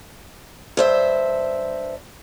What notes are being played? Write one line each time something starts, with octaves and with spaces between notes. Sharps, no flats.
G2 C5 E5